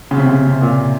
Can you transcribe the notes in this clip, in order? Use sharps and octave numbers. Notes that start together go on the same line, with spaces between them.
C#3
C3
C#3
C3
C3
A#2